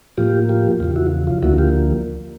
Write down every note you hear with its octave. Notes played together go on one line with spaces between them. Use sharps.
A2 F3 A#3 F4 G4
F4 G4
E2 C#3 F3 F4
E4 F#4
F4
D2 D3 F3 A#3 E4 F#4
F4 G4